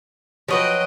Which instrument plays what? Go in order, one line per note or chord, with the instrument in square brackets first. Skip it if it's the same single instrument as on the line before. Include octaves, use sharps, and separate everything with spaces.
[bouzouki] F3 F#3 B4 [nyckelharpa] D#5 G5